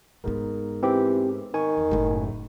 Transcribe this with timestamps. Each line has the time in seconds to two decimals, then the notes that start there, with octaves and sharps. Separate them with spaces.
0.24 G#2 A3 B3 A#4
0.83 E3 C4 G4
1.54 D#3 G#5 C#6
1.77 E2
1.91 F#1 A2 A3